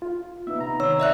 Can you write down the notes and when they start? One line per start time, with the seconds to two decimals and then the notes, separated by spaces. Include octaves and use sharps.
0.02 F4
0.47 B3 D#4 B4 E5
0.60 C3 A#5
0.80 D#3 D#4 C#5 E6
1.00 D5 E5 F#6